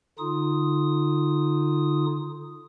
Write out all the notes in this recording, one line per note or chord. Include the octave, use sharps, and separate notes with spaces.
D3 D#4 F4 D#6